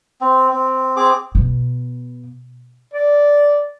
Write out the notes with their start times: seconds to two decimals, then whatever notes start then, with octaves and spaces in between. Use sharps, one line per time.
0.21 C4
0.51 C4
0.97 C4 G#4 D6
1.35 B2
2.94 D5